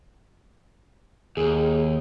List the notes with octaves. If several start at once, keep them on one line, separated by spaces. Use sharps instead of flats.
D#2 G#4